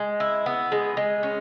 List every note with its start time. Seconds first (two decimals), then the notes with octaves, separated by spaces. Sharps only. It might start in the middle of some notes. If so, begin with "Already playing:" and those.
Already playing: G#3
0.20 E4
0.46 B3
0.72 G#3
0.97 G#3
1.23 C#4